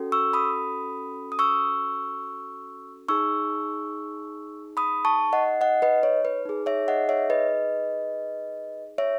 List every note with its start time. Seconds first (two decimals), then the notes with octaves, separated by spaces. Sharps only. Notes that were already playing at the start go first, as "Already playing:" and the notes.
Already playing: C#4 F#4 A4
0.12 C#6 E6
0.33 B5 D#6
1.32 D#6
1.39 C#6 E6
3.08 D#4 G#4 C#6 E6
4.77 B5 D#6
5.05 A5 C#6
5.33 D#5 F#5
5.61 D#5 F#5
5.82 B4 D#5
6.03 C#5
6.25 B4
6.45 D#4 G#4
6.66 C#5 E5
6.88 D#5 F#5
7.09 C#5 E5
7.30 B4 D#5
8.98 C#5 E5